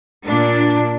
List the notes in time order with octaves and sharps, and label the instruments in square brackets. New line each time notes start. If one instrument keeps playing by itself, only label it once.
[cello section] A#2 D4